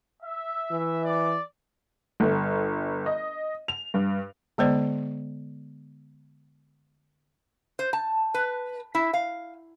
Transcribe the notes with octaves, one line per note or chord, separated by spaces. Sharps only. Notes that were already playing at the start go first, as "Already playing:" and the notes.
E5
E3
D5
G1
D#5
F7
G2
D3 G#3 B3 C5 D5
C5
A5
B4
E4
F5